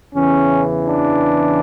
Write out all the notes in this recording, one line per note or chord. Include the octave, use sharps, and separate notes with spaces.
E2 C#3 E3 C#4
D4